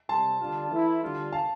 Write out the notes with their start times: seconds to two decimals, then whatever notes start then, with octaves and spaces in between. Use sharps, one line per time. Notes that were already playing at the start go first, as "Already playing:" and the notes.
0.09 C3 G3 C4 A5 C6
0.40 D3 G3 D4 F4
0.71 E3 A3 E4
1.02 D3 G3 D4 F4
1.32 F5 A5